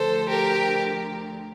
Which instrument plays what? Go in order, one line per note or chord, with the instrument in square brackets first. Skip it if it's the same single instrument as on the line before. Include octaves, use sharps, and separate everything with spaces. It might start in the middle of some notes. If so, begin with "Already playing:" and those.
Already playing: [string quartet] D2 D3 F3 A4 C5
G4 A#4